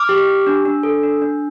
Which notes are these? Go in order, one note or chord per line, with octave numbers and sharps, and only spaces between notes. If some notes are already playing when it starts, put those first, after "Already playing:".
Already playing: D6 F6
G4
G4
D4
D4
A4
D4
D4